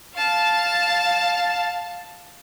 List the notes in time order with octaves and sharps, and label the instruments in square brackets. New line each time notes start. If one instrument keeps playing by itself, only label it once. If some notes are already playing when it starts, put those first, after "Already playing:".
[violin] F5 A5